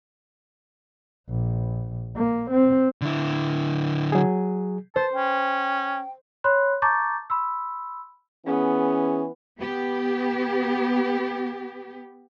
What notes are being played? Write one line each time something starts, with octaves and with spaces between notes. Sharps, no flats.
A#1
A#3
C4
D3 E4
F#3 G#4
C5 A5
C#4 G5
C#5 B5 C6 F#6
A5 A#5 C#6 D6 G6 A6
B5 C6 E6
E3 B3 C#4 G#4
B3 G4